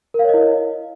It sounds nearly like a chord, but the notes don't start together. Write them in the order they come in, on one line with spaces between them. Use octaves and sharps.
A#4 F5 C#5 D#5 E4